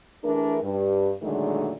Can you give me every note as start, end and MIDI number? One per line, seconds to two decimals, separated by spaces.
0.24 0.60 52
0.24 0.60 57
0.24 0.60 62
0.24 0.60 68
0.24 0.60 70
0.63 1.13 43
1.22 1.71 46
1.22 1.71 50
1.22 1.71 51
1.22 1.71 54
1.22 1.71 56
1.22 1.71 57